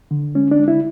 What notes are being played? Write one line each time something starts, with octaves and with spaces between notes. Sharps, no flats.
D3
G#3 C#4
D4
G#3
E4